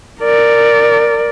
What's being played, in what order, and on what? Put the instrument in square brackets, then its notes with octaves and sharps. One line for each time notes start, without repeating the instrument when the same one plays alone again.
[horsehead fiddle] A#4 D5